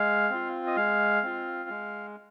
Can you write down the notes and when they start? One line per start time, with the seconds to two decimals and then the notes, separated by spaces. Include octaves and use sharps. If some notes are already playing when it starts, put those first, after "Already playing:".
Already playing: G#3 F5
0.30 C4 F4
0.67 D#5
0.76 G#3 F5
1.23 C4 F4
1.69 G#3